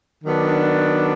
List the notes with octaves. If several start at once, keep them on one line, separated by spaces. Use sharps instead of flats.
D#3 F#3 B3 D4